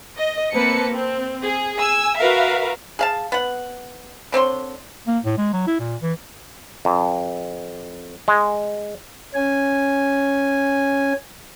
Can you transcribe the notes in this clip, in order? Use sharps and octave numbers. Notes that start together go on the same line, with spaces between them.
D#5
A#3 C4 B4 C5 A5 C#7
C4
G#4
G#5 E6
F#4 A#4 B4 E5 F5
G#4 F5 A5
B3 F#5
D3 C4 C#5 C6
A#3
A2
G#3
F#3
E4
A#2
E3
F2
G#3
C#4 G#5